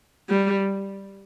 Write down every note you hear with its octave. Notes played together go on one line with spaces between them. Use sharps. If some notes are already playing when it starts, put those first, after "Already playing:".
G3